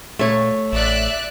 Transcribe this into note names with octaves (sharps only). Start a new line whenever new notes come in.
A#2 A3 C#5
A1 D5 E5 F#6